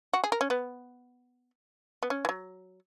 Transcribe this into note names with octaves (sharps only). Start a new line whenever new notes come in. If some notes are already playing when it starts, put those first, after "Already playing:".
F#4
G#4
A#4
C#4
B3
B3
C#4
E3
F#3